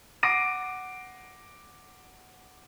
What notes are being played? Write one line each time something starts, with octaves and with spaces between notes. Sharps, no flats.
F#5 D6 A#6 C7 D7 D#7